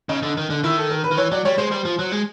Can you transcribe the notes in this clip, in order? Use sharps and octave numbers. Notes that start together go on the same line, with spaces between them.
C#3 D#4
D3
D#3
D3
D#3 E4
A4
A#4
B4
D#3
E3 C#5
F#3 D5
G3 C#5
G#3 C5
G3 C5
F3
F#3
G#3